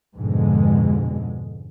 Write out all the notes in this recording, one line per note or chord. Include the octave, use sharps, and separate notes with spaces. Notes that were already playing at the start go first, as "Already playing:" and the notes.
F2 G#2 B2 D3 G#3